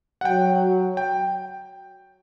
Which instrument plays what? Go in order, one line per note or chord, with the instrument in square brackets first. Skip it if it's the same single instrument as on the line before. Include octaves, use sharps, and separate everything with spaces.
[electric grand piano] F#5
[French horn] F#3 [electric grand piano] G5
[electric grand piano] G5